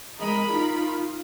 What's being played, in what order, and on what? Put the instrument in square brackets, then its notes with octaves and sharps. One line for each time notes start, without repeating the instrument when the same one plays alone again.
[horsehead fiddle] G#3 D#5 [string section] A#4 B5
[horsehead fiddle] D#4 F4